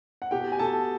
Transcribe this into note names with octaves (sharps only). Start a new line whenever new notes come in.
F#5
B2 G4 G5
G#5
B2 A4 A5